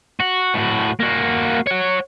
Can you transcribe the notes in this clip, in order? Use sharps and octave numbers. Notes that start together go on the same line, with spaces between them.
F#4
A2 F#4
A#3 F#4
C#5 F#5